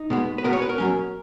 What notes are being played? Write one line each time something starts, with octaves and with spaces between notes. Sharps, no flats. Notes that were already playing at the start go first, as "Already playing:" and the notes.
Already playing: D#4
B2 G#3 B3
B4
B2 G#3 B3 A#4
C#5
B4
A#4
B2 F#3 C#4